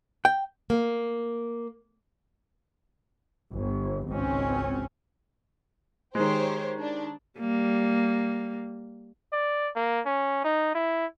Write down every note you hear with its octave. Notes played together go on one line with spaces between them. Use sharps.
G5
A#3
G1
G#1 C#2 C4 C#4
D#3 G#3 G4 C5 C#5
D4
G3 A#3
D5
A#3
C#4
D#4
E4